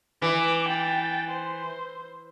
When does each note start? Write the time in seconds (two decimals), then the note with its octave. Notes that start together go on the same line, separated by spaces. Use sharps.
0.22 E3 D6
0.68 G5 A6
1.30 C5